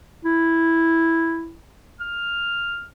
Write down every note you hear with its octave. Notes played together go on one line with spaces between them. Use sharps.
E4
F6